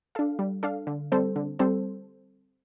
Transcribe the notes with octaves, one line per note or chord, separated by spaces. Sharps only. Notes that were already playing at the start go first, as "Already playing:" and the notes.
D4 A4 F5
G3
D4 A4 F5
D3
G3 C4 A4 C5
D3
G3 C4 A4 C5